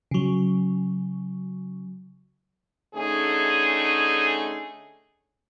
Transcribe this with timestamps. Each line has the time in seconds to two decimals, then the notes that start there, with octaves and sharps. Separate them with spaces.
0.11 C#3 F#3
2.95 D3 A3 C#4 D#4 G#4